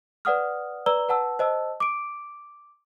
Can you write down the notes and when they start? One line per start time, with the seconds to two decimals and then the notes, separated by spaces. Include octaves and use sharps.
0.25 B4 D5 F#5 D#6 F6
0.86 B4 D5 A#5 E6 G7
1.09 B4 F#5 A5 E6
1.39 C5 D#5 A5 E6
1.80 D6 D7